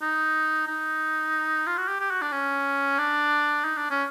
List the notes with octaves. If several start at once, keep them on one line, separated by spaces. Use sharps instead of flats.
D#4
D#4
F4
F#4
G4
G4
F#4
D4
C#4
D4
D#4
D4
C#4